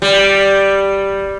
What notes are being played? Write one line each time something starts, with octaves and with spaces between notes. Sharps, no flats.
G3